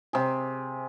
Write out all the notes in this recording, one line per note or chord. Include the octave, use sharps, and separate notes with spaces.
C3 G#4